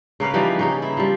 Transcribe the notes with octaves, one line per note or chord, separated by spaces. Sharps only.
C#3 A#3 B4 F5
E3 F3 G3 D#4
C#3 D#4 G#4
E4
F3 G3